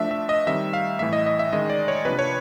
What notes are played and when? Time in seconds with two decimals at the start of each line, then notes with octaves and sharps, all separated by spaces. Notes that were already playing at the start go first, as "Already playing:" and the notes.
Already playing: F3 A3 D4 E5
0.11 E5
0.29 D#5
0.47 D#3 G3 C4 E5
0.73 F5
0.99 A2 E3 A3 E5
1.13 D#5
1.26 D#5
1.39 E5
1.53 D#3 G#3 C#4 D#5
1.70 D5
1.88 C#5
2.05 C3 F3 A#3 D4 B4
2.19 C#5